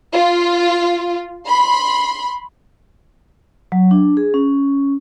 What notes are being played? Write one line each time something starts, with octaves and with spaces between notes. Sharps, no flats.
F4
B5 C6
F#3
D4
G#4
C#4